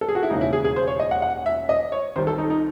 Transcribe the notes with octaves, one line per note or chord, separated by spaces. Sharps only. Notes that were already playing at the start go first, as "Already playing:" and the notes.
A4
G#4
F#4
E4
E1 D#2 C#3 D#4
E4
G#4
G#4
C5
C#5
D#5
F#5
F#5
E5
D#5
C#5
C2 C3 D#3 C5
A4
D#4
D#4